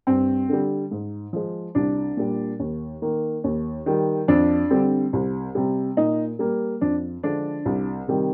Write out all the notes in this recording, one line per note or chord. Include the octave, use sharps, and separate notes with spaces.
G2 C4
D3 G3
G#2
F3 G#3
C2 D4
A#2 G3
D#2
D#3 A#3
D#2
D#3 G3
F2 D4
D3 G3 C4
C2
C3 G3
A#2 D#4
G3 A#3
F2 D4
D3 F3 G#3 D4
C2
C3 D#3 G3